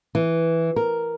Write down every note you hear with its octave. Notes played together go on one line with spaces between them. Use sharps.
E3
A#4